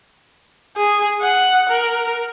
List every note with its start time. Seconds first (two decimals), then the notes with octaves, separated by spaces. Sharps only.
0.77 G#4
1.22 F#5
1.69 A#4